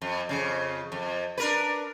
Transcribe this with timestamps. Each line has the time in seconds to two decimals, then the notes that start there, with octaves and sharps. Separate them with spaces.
0.02 F2
0.29 F2 A2 C#3
0.92 F2
1.37 D4 A#4 B4